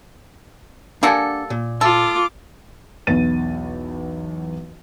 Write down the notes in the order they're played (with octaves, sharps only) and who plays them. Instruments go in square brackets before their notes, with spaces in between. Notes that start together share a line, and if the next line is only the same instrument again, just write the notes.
[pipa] G3 A#3 A4 [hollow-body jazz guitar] D4 F#5 G#5
[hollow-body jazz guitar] A#2
[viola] F4 D6 [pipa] A4
[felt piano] B1 E2 B4 A6 D#7